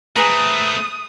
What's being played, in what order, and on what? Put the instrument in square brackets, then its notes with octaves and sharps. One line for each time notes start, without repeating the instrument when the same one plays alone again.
[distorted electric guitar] A3 C4 [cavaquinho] G#4 B4 A#5 [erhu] D#6